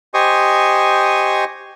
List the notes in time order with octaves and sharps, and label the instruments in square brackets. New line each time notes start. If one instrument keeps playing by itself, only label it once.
[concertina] G4 C5 D#5 G#5 C#6 D#6